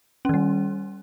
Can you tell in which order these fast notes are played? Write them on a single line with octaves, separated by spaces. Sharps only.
C#4 D#3 G3